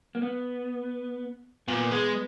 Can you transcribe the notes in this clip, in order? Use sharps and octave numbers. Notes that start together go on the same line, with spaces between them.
A#3
B3
A#2 B3
G#3